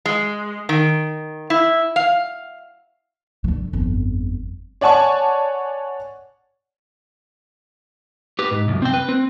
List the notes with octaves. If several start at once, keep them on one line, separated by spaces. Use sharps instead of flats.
G#3
D#3
E4
F5
D3 D#3
G1 F2
C#5 D5 F#5 G#5 A5 C#6
G4 B4
G#2
C2 F#2
C4 G5
B4
C4